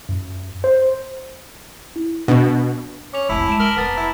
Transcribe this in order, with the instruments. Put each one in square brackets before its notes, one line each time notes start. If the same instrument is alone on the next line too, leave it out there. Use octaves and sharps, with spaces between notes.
[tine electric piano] F#2
C5
[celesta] E4
[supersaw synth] B2 [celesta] D4
[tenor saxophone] C#4 [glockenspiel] D6 F7
[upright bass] F1 C2 [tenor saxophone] E4 [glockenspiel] G#5 A5 B5
[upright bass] G#3 [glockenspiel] A5 D7 E7
[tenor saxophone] A#4 [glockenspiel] B6 F#7 G7
[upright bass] F1 [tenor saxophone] B3 [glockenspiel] A#5 A6 B6
[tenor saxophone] E4